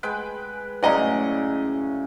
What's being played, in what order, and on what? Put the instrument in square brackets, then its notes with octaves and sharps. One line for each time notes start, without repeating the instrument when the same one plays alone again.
[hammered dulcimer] G#3 B4 G5
[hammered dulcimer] F#2 A2 C#3 [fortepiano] D5 D#5 A#5